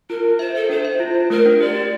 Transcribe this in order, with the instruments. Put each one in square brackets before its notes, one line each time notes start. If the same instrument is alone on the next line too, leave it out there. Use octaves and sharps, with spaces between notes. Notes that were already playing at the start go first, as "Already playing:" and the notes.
[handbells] F4 [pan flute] A#4
[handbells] F4
[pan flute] C5 [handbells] E5
[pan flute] A4 [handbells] E5
[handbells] D4 [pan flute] C5
[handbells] E5
F4
F4
[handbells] A3 [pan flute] A#4
[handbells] D4
[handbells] G4 [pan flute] D5
[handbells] G4